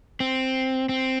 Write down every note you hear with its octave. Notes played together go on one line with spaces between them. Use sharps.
C4
C4